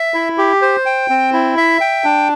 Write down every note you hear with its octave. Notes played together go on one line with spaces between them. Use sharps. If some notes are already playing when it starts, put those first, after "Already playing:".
Already playing: E5
E4
G4
C5
G5
C4
E4
E5
G5
D4